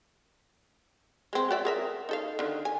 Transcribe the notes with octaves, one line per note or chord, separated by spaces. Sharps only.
G#3 C4
F#4 D5 E5
G#4 A#4 E5
D#4 A4 F5
D3 D#3
G#5